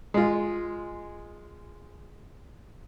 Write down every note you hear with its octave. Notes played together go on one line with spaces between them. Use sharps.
G#3 F4